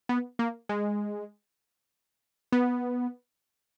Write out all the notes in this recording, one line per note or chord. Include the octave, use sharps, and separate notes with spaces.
B3
A#3
G#3
B3